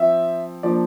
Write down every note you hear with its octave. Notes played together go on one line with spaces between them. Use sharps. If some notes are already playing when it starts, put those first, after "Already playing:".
Already playing: F3 C4 E5
F3 A#3 D4 D5